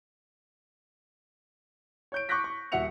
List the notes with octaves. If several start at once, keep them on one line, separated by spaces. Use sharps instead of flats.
C#5 G6 D7
C#6 D6 F#6 G6 A#6 B6
C#6
D#1 F#4 E5 F#5 C#7 F7